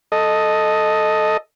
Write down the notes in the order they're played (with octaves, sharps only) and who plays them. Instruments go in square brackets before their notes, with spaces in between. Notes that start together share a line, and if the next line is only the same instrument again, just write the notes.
[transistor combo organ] A4 D#5